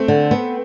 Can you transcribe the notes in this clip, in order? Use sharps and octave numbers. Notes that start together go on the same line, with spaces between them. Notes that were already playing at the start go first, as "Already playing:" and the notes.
Already playing: A3 C4
D3
B3